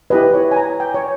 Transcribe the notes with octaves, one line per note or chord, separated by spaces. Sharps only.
E4 G4 B4 D#5
C#5
G#5
A#5
G5
C#5